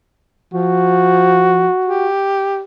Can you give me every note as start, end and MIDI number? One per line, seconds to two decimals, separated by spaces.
0.54 1.68 53
0.54 2.08 66
1.86 2.63 67